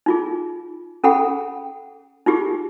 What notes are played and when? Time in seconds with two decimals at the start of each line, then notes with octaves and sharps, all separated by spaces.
0.06 D#4 F4 G#4
1.04 C#4 G#4 A4 F#5 G5 B5
2.26 D#4 F4 G4 G#4